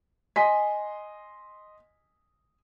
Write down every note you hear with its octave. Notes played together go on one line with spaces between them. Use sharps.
D#5 G#5 C6 B6